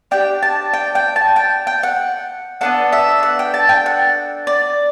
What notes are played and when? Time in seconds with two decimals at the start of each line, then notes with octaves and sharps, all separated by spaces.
0.11 D4 G4 G5
0.42 A5
0.73 G5
0.95 G5
1.16 A5
1.36 G5
1.67 G5
1.83 F#5
2.61 B3 D4 A4 F#5
2.92 E5
3.23 F#5
3.39 G5
3.54 A5
3.69 G5
3.86 F#5
4.47 D5